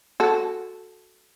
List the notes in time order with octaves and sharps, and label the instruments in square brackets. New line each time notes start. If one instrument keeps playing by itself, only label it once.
[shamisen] F#4 A4